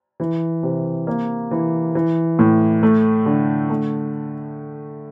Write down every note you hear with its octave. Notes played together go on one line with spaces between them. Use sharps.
E3
C3
A#3
E3
E3
A2
A3
D3
A3